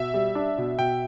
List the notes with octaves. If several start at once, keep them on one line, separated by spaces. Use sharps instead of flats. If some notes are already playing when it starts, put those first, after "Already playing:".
Already playing: B2 E5
G3
D4
B2
B2 G5